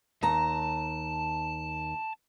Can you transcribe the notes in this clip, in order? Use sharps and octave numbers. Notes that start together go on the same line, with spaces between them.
D#2 A5 A#5